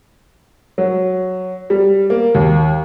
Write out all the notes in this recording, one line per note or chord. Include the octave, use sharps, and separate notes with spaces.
F#3
G3
A#3
D#2